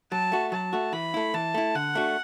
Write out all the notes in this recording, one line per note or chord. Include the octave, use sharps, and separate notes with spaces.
F#3 A5
A3 F#4
F#3 A5
A3 F#4
E3 B5
A3 E4
E3 A5
A3 E4
D3 F#5
A3 D4 F#4